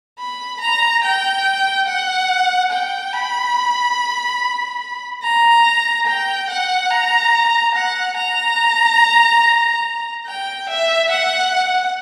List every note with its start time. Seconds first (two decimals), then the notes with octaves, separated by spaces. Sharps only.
0.19 B5
0.61 A#5
1.03 G5
1.87 F#5
2.72 G5
3.13 B5
5.23 A#5
6.07 G5
6.50 F#5
6.90 A#5
7.75 F#5
8.17 A#5
10.27 G5
10.69 E5
11.11 F#5